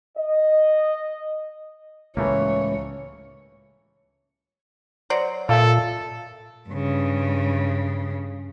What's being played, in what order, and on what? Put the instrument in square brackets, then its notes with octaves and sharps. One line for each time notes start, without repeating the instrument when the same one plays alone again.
[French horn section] D#5
[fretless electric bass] C#2 A2 C#3 [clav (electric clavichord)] E3 A3 A#3 [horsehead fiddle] C#5
[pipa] F#3 C5 D5
[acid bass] A#2 [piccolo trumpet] A4 [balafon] E5 F5
[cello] G2 C#3